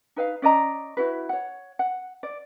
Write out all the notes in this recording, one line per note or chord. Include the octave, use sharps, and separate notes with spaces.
D#4 B4 E5 F5
C#4 D5 D#5 A#5
E4 F#4 B4
C#5 F#5
F#5
D5